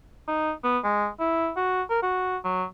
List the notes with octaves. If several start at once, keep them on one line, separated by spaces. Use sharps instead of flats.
D#4
B3
G#3
E4
F#4
A#4
F#4
F#3